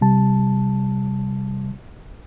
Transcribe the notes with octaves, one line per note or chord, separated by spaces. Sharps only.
C3 G3 A5